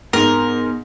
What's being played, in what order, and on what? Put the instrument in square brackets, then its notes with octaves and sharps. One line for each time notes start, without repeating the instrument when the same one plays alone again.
[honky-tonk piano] G#2 [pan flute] B3 [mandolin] A#4